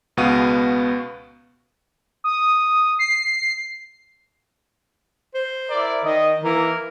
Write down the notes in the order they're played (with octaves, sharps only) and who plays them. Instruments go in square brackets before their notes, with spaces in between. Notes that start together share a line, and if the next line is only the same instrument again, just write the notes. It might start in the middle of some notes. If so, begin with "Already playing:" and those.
[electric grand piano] C#2 B2 B3 F#4 F5 D#7
[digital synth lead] D#6
C7
[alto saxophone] C5
[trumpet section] E4 A#4 D5
[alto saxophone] D#3 [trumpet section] D#5
[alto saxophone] E3 [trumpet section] A#3 A#4